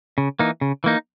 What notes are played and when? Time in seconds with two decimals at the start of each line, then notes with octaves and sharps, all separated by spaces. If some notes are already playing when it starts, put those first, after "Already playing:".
0.18 C#3
0.39 E3 A#3 D#4
0.61 C#3
0.84 E3 A#3 D#4